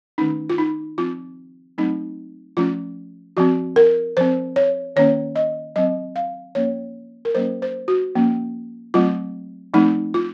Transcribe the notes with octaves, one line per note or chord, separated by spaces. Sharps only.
D#3 A3 C#4 D#4
F4
D#4
F3 C4 F4
F#3 A3 C4 D#4
F3 A3 C#4 F4
F3 C4 F#4
A#4
F3 C4 C5
C#5
D#3 A#3 C#4 C#5
D#5
F#3 C4 D#5
F5
F3 A#3 C#4 C#5
A#4
F#3 A#3 C#4 C5
C5
F#4
F3 A#3 C#4
F#3 A3 C4 F4
F3 A3 C4 D#4
F4